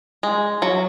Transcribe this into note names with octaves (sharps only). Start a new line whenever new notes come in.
G#3
F#3